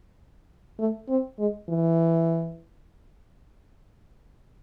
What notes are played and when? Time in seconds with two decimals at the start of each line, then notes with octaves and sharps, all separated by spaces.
0.79 A3
1.09 C4
1.39 G#3
1.69 E3